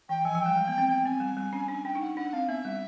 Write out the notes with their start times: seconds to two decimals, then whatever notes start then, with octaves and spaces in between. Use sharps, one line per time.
0.09 E3 G5
0.25 F3 G#5
0.35 F3
0.41 G3 G5
0.57 G#3
0.68 B3
0.78 C4
0.89 B3 G5
1.05 C4 G#5
1.20 G3
1.37 G3
1.53 C#4
1.68 D4
1.85 D4 G5
1.95 D#4
2.01 F#5
2.06 D#4
2.17 D4 F#5
2.33 C4 F5
2.49 B3 E5
2.65 G3